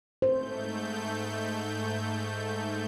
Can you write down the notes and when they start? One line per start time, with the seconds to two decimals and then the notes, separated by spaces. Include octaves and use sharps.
0.22 G#2 A3 C5 G6